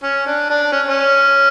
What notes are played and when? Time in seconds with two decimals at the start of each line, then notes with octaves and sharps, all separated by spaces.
0.03 C#4
0.26 D4
0.50 D4
0.72 C#4
0.87 C#4